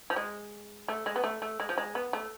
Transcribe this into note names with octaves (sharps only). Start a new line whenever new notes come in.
F3
G#3
A3
G#3
B3
A3
A3
G#3
F3
G#3
B3
A3